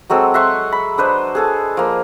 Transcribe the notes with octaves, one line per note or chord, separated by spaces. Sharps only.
F#3 G#3 C4 A4
E5 F#5 C6 C#6
B5
D4 B4 C5 D#5
G#4 A4 A5
F3 A#3